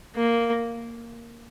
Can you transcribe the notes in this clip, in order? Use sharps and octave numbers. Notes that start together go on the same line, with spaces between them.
A#3